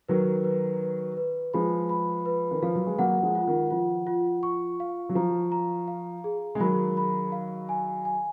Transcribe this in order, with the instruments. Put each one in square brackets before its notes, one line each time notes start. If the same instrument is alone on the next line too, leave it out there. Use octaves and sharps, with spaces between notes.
[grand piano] D#3 F#3 [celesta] B4
[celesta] B4
B4
B4
[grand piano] F3 G#3 [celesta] B5
[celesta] B5
B4
[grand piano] D#3
[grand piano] F3 [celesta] F5
[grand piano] F#3
G#3
[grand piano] F#3 A#3 [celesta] F#5
[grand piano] F3 G#3
[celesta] F4
[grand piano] D#3
[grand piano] F3 [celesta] F4
[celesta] F4
C#6
F5
[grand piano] F#3
[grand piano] F3 [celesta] A#5
[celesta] A#5
F5
G#4
[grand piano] G#3
[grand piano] D#3 F#3 [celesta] B5
[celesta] B5
F5
G#5
G#5